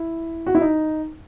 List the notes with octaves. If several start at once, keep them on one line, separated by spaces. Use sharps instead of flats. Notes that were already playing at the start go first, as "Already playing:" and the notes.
Already playing: E4
F#4
E4
D#4